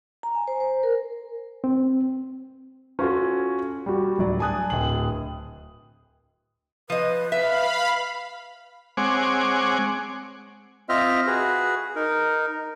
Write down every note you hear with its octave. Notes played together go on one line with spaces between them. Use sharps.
A#5
G#5
C5
C5
A#4
C4
C#4 F4 F#4 A4
G3 F#4
D1 F#3 D5
G#5 A5 D#6 F#6
D1 G5 F#7
F3 B4 D#5
E5 F5 B5
G#3 C4 C#5 F#5 G#5 D6
C4 F4 C5 D#5 E5 F6
F#4 G#4 B4
D#4 A#4